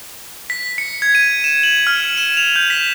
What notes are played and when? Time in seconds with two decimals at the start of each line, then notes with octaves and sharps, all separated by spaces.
0.50 B6
0.78 C#7
1.02 G#6
1.15 D#7
1.44 E7
1.63 F#7
1.87 F6
2.18 E7
2.37 F7
2.56 G6
2.70 B6